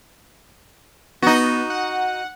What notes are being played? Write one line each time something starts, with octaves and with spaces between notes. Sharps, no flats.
B3 D#4 F#4
F#5